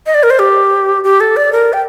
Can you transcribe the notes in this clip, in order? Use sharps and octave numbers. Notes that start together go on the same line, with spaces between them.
D#5
D5
A#4
C5
G4
G4
A4
D5
A#4
G5